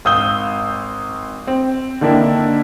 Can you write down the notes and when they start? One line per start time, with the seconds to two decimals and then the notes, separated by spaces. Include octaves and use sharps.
0.05 G#1 F5 D#6 E6 G6 G7
1.47 C4
2.01 D3 D#3 A#3 D4 E4